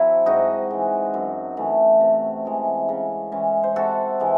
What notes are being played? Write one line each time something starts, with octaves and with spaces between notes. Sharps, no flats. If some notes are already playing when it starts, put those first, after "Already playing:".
Already playing: F#3 C4 E4 A4
G#2 D#4 F#4
E3 G#3
F#2
E3 A3
C3
E3 G#3
C#3
E3 G#3 C#4
C5
C3 F#4 A4
E3 G#3